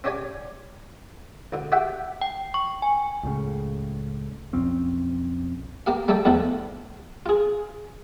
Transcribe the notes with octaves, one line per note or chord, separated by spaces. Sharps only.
C4 C#4 G4 C#5 D5 G#5
D2 D3
F#4 G4 E5 F#5 G5
G5
C#6
G#5
C#2 A2 C#3
B1 F2 C4 C#4
A#3 G4 F5
G3 A3 A#3 A4 D5 G5
E2 D3 F3 A3
F4 G#4